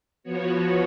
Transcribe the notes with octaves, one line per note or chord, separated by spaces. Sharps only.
F3 B3 F#4 C#5